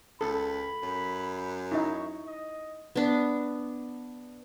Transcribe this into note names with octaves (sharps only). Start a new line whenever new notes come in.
C#2 A4 B5
F#2
D#4 E4 C#6
D#5
B3 D4